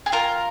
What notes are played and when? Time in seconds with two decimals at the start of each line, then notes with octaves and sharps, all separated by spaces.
0.06 G#4
0.12 F4 A#4